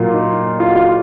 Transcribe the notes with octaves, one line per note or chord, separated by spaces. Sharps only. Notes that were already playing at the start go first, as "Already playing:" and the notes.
Already playing: A#2 F#3 A#3 F4
D#4
F4
F#4
F4